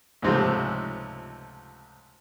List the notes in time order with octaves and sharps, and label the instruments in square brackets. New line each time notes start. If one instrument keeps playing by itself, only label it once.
[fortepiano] C#2 G#2 C3 F3 A3